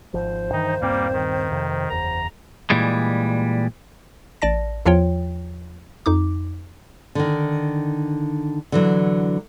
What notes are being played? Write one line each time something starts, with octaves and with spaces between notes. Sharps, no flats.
G#1 F3 C5
G2 D#3 E3 D#4
D#1 G2 G3 A#3 C4
D#3
F2 C3
F#1 E2 A#5
A#2 E3 G3 G#3
A1 D5 A5 A#6
E2 F3 F4 C#5 G5
F2 D#4 D6
D3 D#3
D3 E3 F#3